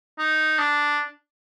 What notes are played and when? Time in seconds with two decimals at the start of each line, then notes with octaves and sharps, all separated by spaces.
0.19 D#4
0.59 D4